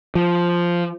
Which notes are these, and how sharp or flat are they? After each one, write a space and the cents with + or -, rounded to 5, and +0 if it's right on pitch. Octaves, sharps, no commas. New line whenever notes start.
F3 -5